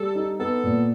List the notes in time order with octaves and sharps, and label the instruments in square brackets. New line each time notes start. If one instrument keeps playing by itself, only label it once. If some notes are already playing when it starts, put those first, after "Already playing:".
Already playing: [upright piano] G3 [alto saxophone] A4
[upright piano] D#4
[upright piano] B3 [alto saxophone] A4
[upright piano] A#2